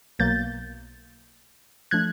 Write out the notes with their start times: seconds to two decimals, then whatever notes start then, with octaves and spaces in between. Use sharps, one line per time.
0.19 B1 B2 F#3 A#3 G6 A6
1.91 F3 A3 D4 F#6 G#6